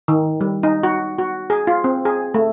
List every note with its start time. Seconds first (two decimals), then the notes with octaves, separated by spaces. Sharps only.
0.08 D#3
0.41 G3
0.63 D#4
0.83 F#4
1.18 F#4
1.50 G#4
1.67 F4
1.84 C4
2.05 G#4
2.34 A3